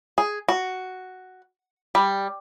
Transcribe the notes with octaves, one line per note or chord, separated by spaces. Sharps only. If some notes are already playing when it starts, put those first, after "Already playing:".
G#4
F#4
G3